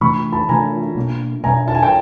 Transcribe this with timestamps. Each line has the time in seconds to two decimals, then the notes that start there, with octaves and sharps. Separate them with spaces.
0.01 C3 E3 A3 D4 B5 C#6
0.32 A5 B5
0.49 C3 E3 A3 D4 G#5 A#5
0.96 B2 G3 A#3 D4
1.44 B2 G3 A#3 D4 G#5 A#5
1.68 A5
1.75 G#5
1.83 G5 A5